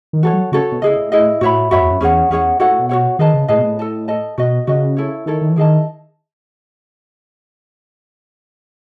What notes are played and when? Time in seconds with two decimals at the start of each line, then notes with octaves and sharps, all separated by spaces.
0.13 D#3
0.22 E3 F#4 A4 C#5
0.33 F#3
0.52 C#3 F#4 A4 C#5
0.72 B2
0.82 C#3 E4 G#4 D#5
0.96 A2
1.12 E4 G#4 D#5
1.41 A2 F#4 C#5 E5 B5
1.71 F#2 F#4 C#5 E5 B5
1.81 E2
1.90 F#2
2.01 E2 C#4 G#4 C#5 F#5
2.30 E2 C#4 G#4 C#5 F#5
2.60 G#2 F#4 A4 C#5 F#5
2.70 A2
2.79 B2
2.89 F#4 A4 C#5 F#5
3.19 D#3 G#4 B4 D#5 A5
3.34 C#3
3.48 A2 G#4 B4 D#5 A5
3.58 B2
3.63 A2
3.79 A4 D#5 A5
4.08 A4 D#5 A5
4.38 B2 F#4 B4 D#5
4.67 C#3 F#4 B4 D#5
4.97 E4 A4 C#5
5.26 D#3 E4 A4 C#5
5.41 D#3
5.50 E3
5.56 D#3 E4 G#4 D#5 A5